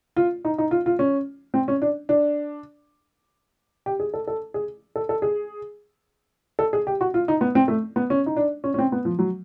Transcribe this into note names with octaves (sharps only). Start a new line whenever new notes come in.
F4
D#4
D#4
F4
F4
C#4
C4
C#4
D4
D4
G4
G#4
A4
A4
G#4
A4
A4
G#4
A4
G#4
G4
F#4
F4
D#4
B3
C4
A3
B3
C#4
D#4
D4
C#4
C#4
C4
B3
F3
F#3